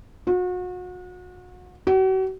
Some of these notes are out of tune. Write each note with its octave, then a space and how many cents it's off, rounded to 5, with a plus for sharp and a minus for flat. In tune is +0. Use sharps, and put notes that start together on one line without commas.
F#4 -35
F#4 +40